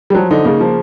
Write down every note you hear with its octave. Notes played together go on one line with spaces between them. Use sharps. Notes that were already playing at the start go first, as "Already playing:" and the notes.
G3
F3 F#3
D3 D#4
C#3 A#3
F3